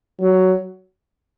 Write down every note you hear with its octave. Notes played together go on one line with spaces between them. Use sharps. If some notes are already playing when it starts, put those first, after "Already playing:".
F#3